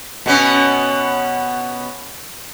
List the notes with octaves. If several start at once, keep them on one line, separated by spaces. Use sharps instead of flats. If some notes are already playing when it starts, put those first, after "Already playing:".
B2 B3 C#4